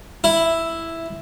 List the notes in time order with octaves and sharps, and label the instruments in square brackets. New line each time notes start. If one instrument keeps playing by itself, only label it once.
[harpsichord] E4